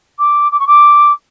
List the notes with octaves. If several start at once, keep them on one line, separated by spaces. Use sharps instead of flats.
D6
D6
C#6
D6